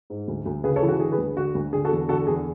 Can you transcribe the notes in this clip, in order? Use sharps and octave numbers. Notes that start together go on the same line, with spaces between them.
G#2
D2
D2
C#3 G#4 B4
A4 C#5
E3
F#4
D3 G#4
G#4 B4
D2
D3 F#4
D2
D3 G#4
F#4 A4
E2
D3 F#4 A4
E2 G#4